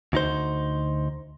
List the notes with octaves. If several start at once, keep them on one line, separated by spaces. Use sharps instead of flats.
D2 D#4 C5